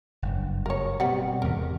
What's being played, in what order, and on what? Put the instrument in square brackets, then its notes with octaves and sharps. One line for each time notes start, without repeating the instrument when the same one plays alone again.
[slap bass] F#1 G2
[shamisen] A#4 C#5
[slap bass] B2 [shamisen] G3 C4 F#5
[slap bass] E2 G#2 C3 [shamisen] A#4